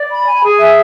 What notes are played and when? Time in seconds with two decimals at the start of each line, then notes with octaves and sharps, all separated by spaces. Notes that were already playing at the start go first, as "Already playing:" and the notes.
Already playing: D5
0.09 B5
0.27 G#5
0.43 G#4
0.58 E5